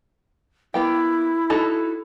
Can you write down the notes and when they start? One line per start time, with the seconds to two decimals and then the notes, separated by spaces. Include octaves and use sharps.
0.74 A#3 B3 E4 G5
1.50 D#4 F#4 A4